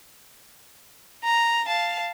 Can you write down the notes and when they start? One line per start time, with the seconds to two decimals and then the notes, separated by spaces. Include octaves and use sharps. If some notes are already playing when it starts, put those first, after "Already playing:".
1.23 A#5
1.67 F5 A5